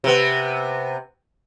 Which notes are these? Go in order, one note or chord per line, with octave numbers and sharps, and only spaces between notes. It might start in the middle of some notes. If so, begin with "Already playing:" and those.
C3 B3